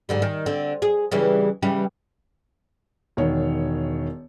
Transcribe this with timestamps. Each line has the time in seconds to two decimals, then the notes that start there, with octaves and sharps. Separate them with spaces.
0.09 G#2 D3 G3
0.22 D#3
0.46 D3 C4
0.82 G#4
1.12 C#3 E3 G3
1.62 C#3 E3 G3
3.17 E1 D#3 C#5